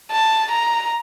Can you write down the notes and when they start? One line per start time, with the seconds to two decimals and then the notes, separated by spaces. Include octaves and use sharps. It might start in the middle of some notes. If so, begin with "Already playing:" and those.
0.12 A5
0.51 A#5